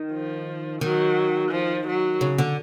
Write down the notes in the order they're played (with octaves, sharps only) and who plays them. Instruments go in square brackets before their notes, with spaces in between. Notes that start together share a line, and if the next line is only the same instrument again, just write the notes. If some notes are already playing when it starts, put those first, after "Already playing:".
Already playing: [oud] D#3
[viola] F3
[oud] D#3 [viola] F#3
[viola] F3
F#3
[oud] C#3
D3